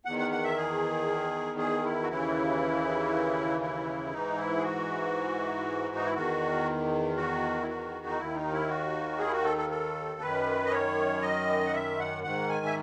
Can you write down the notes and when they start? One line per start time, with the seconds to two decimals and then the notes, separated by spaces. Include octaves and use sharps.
0.05 E2 D#3 F#5
0.19 F#5
0.31 F#5
0.44 E5
0.57 G#4
1.58 G#4
1.83 E4
2.03 F#4
2.09 D#2 C#3 E3 E4
3.61 E4
4.12 G#2 E3 D#4
4.37 E4
4.58 G#4
4.63 F#4
5.95 D#4
6.04 E4
6.14 E2 D#3 F#4
7.17 F#4
7.62 E4
7.68 F#4
8.06 D#4
8.18 D#2 D#3 E4
8.35 D#4
8.52 E4
8.68 F#4
9.19 G#4
9.27 E4
9.32 F#4
9.45 A4
9.57 A4
9.70 A4
10.21 F#2 D#3 B4
10.65 D#5
10.71 C#5
11.22 D#5
11.67 F#5
11.73 E5
11.99 F#5
12.23 G#2 D#3 F#5
12.49 G#5
12.66 E5